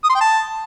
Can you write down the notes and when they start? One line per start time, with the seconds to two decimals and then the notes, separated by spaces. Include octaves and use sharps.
0.04 D#6
0.09 C6
0.15 G5
0.21 A5